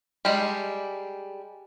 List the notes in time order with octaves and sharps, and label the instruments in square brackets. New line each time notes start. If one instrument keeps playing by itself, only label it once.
[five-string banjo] G3 G#3 D4 G4